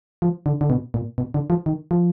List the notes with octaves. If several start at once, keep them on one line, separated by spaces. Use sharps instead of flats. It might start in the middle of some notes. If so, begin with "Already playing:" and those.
F3
D3
D3
B2
A#2
B2
D3
F3
D#3
F3